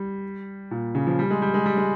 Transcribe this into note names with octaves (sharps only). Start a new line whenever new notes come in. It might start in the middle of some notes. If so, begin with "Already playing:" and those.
Already playing: G3
A#2
C#3
F3
G3
G#3
G3
G#3
G3
G#3